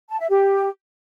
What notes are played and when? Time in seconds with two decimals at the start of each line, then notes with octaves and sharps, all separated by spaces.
0.10 A5
0.20 E5
0.30 G4